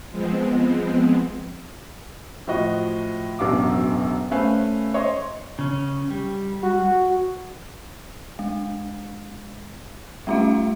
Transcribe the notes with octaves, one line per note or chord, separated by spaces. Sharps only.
F3 G#3 B3 C4
A2 F3 F#4 D#5
E1 A1 F#2 D4 F5 D6
A3 C#4 B4 C5 F5 G#5
C5 C#5 D#5 C6
C#3 C#4
G3
F#4
G#3
G3 A3 C#4 F4 E5 F5